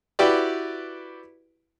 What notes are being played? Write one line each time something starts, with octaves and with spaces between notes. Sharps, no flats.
E4 F#4 G4 B4 D5